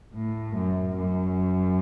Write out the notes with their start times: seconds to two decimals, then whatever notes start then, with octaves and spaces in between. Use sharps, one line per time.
0.15 A2
0.56 F#2
0.98 F#2